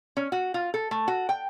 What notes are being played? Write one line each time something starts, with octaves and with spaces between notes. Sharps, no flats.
C#4
F#4
F4
A4
A3
F#4
G5